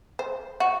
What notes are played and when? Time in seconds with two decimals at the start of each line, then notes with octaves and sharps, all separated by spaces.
0.19 C5
0.60 F#4